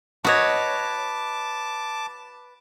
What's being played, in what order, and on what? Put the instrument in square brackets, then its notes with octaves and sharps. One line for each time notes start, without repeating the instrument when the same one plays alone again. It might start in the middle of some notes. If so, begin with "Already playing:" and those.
[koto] F#4 C#5 [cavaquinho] B4 D#5 [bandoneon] A5 D6